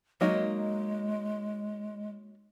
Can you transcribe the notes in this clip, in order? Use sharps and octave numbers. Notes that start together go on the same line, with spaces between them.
F#3 G#3 A#3 D#4